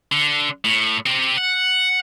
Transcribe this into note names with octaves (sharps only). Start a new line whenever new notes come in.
D3
A2
C4 G4
F#5